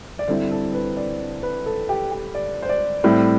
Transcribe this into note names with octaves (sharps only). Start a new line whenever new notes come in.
D5
D3 G3 C4 E4 C5
A4
B4
D5
B4
A4
G4
G4
D5
C5
D5
A2 G3 C4 E4